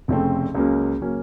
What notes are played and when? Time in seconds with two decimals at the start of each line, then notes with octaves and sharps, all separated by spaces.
0.08 F1 F2 C#3 A3 C4
0.55 C#2 C#3 F#3 A#3 C#4
1.01 C#3 F#3 A#3 C#4